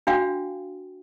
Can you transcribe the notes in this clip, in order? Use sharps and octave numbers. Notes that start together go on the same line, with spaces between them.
D4 F#4 F5 G5